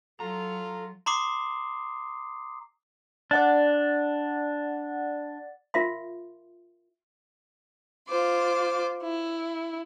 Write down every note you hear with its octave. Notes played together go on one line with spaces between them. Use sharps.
F#3 F4 A4 A#5
A#5 C6 D6 D#6 C7
D4 D5 F#5 A6
F4 A#4 E5 F5 C6
F4 C5 D6
E4